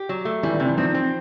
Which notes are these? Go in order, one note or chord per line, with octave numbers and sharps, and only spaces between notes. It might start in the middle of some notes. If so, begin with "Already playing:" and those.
Already playing: G4
F#3
A3
E3 G3
E3
C3
E3
D#3 F3 C4
C4